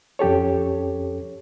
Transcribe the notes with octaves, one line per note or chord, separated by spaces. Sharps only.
F2 C#4 G4 A4 C#5